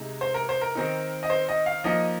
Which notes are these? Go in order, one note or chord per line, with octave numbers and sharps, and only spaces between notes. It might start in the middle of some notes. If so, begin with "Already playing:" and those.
Already playing: C3 G#3 D#4
C5
A#4
C5
A#4
D#3 C4 D#4
D#5
C5
D#5
F5
F3 A#3 D#4 D#5